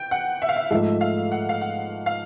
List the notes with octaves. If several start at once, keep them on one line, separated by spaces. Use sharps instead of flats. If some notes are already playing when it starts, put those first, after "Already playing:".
Already playing: G5
F#5
E5
F5
E5
G#2 F3 A3 E5
F5
F#5
F5
F#5
F5